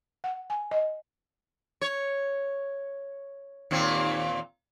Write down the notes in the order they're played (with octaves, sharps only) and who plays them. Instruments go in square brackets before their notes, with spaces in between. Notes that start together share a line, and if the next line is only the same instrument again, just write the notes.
[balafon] F#5
G#5
D#5
[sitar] C#5
D#2 A#2 C4